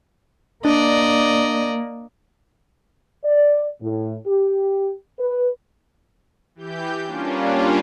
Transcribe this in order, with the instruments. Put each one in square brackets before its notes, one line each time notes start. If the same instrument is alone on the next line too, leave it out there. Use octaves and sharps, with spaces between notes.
[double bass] A#3 [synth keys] D4 [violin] D5 D#5
[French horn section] D5
A2
G4
B4
[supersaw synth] E3 G4 G6
G3 A#3 C#4 D4 F4